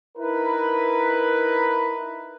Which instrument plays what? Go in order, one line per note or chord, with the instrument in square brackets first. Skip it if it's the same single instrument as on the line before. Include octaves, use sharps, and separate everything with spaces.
[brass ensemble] D#4 E4 A#4 B4